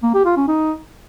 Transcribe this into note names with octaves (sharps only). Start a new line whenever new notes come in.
A#3
G4
F4
C#4
D#4